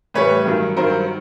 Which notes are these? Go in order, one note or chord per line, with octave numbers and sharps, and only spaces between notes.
A2 E3 G3 B4 C#5
G2 D#3 F#3
G2 D#3 F#3 A#4 C5